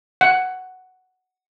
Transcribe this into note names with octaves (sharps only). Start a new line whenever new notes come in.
F#5